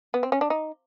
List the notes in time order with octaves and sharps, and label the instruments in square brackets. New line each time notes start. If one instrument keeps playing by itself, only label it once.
[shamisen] B3
C4
C#4
D4
D#4